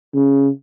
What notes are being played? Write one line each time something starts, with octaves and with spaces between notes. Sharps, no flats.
C#3